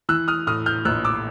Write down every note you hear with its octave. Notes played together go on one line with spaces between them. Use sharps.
E3 E6 F#6
D#6 F6
A2 D#6 F6
F6 G6
A#1 E6 F#6
D6 E6